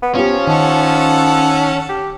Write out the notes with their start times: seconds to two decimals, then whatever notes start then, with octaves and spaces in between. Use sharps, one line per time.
0.03 B3
0.15 F3 B3 C#4 F4 G4
0.47 D#3 A4 F#5
1.89 G4